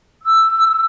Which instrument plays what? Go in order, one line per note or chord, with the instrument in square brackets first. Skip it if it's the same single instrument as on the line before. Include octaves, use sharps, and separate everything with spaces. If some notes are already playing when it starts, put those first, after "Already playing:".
[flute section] E6